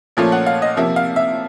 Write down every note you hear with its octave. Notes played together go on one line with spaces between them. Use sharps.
A#2 F3 A3 C#4 F4
F#5
F5
D#5
C3 F3 A#3 E5
F5
E5